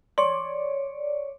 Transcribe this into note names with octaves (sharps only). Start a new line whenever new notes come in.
C#5 D5 C6